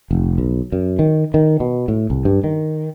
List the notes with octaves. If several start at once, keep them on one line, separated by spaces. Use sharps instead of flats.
F1
B1
F#2
D#3
D#3
B2
A2
C2
G2
D#3